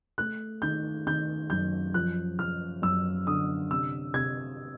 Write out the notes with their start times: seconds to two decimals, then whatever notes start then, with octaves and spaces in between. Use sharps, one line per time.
0.18 A3 F#6
0.62 D#3 G6
1.07 D#3 G6
1.50 F#2 G6
1.94 F3 F#6
2.39 F3 F6
2.82 F#2 E6
3.27 D3 D#6
3.71 C3 E6
4.14 C3 G#6